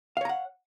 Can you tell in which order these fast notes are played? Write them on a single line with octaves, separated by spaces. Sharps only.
F5 C#5 A#5 F#5